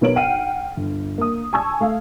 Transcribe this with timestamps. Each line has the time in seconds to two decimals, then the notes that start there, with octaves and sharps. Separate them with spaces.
0.01 B1 B3 A#4 C#5 D7 F#7
0.16 F#5 G5 F6 C7 D#7
0.77 G1
1.18 A#3 D#6
1.53 G#5 A5 C#6 E6 G#6
1.81 A3 F5